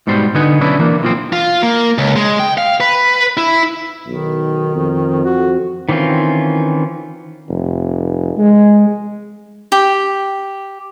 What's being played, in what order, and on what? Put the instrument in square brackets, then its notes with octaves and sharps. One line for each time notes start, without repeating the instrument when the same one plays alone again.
[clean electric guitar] G#2 B2 G3 C5
D3 B3 D#4 B4 G#5
B1 C#4 D4 E4 B4
E3 A#3 D4
B1 A#2 F3 C4
[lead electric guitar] F4
A#3
C#2
G#3
G5
F5
B4
E4
[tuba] B1 [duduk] D#3
[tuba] F2
[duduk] F#4
[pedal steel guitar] D#3 E3 C4 C#4 F4
[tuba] F1
G#3
[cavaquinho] G4